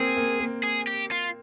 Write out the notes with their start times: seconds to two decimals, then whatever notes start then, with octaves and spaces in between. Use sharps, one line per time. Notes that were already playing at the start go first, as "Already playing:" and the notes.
Already playing: A#3 C4 G#4
0.17 A#3
0.40 A#3
0.63 G#4
0.87 G4
1.11 F4